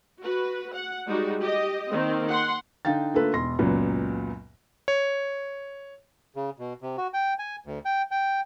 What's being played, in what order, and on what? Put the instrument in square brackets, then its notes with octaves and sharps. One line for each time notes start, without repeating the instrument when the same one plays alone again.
[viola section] F#4 B4
F#5
G3 G#3 D#4 F#4
G4 D#5
D#3 A#3 C4
F#5 C6
[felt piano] D3 D#4 F5 G5 A6
D3 A3 A#3 F4 A4 B4
E1 C6 A#6
C#2 F#2 A#2 F#3 B3
[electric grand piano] C#5
[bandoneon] C#3
B2
C3
F#4
G5
G#5
D2
G5
G5